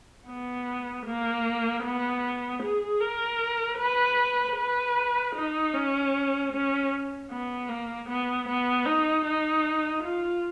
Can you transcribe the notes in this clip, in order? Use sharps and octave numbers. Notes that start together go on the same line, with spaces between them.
B3
A#3
B3
G#4
A#4
B4
B4
D#4
C#4
C#4
B3
A#3
B3
B3
D#4
D#4
F4